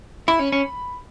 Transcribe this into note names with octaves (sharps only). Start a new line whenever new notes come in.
E4 B5
C#4
C#4